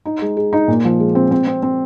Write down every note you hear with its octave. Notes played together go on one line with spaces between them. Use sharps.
D#4
G#3
G#4
D#4
A#2
F3
G#3
C4
C4
C4
C4